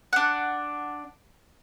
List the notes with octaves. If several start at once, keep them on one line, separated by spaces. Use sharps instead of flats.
D4 F#5